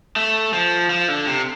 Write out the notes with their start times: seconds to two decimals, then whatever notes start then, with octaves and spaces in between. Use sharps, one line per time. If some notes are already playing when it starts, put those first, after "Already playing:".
0.16 A3
0.53 F3
0.90 F3
1.08 D3
1.27 C3